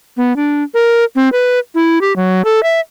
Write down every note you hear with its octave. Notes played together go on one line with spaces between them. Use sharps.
B3
D4
A#4
C4
B4
E4
G4
F#3
A4
E5